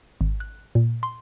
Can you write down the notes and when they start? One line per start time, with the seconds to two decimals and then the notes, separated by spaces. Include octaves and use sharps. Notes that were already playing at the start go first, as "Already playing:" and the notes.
0.21 G#1
0.40 F#6
0.75 A#2
1.03 C6